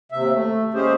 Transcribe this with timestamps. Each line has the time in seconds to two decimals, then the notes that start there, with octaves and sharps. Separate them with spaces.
0.12 D#2 C3 E5
0.33 A3
0.74 D#2 G#3 C#4 G4 G#4 C5